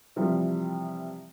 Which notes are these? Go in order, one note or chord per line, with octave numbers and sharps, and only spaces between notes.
C3 E3 F3 G3